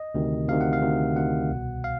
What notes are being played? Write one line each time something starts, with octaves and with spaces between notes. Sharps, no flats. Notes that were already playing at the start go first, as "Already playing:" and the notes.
Already playing: D#5
D2 C3 D#3
D2 C3 D#3 F5
F#5
F5
D2 C3 D#3
D2 C3 D#3 F#5
C2 B2
F5